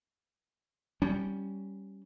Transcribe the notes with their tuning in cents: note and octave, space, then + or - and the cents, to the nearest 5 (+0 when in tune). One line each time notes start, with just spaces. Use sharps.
G3 -5 C#4 +0